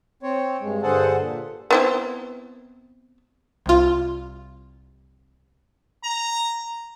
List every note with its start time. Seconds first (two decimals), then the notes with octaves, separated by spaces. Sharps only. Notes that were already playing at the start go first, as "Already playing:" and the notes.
0.23 C4 C#5
0.61 G2 G#3
0.83 G2 D3 G#4 A4 C5 F#5
1.17 A#2
1.71 B3 C4 E4
3.66 C2 F4
6.04 A#5